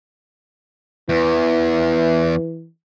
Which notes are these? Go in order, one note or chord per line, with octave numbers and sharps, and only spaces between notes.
E2 E3